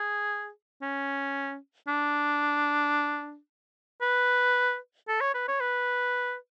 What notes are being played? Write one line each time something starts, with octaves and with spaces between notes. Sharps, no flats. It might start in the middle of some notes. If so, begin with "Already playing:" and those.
Already playing: G#4
C#4
D4
B4
A4
C#5
B4
C#5
B4